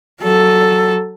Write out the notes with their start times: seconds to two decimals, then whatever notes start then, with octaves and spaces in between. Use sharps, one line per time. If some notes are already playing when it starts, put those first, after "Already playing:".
0.21 F#3 A4